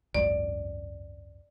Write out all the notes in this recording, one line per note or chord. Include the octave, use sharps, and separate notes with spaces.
G#1 C#2 F#2 D5